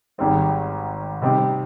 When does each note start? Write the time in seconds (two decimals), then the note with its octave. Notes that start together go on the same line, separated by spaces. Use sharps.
0.18 G#1 G#2 G3 C4 D#4
1.22 C3 G3 C4 D#4 G4